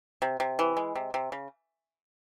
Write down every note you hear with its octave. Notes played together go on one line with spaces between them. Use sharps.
C3
C3
E3
G#3
C3
C3
C#3